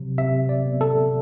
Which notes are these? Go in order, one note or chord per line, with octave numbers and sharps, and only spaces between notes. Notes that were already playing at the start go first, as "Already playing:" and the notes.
Already playing: C3 F#3
C3 E5
D5
B3
A4